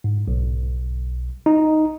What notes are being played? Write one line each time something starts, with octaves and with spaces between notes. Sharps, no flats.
G#2
B1
D#4